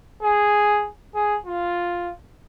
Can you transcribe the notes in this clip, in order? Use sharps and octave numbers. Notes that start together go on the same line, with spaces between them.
G#4
G#4
F4